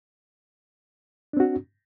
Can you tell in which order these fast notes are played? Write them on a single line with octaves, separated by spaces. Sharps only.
D4 C4 F#4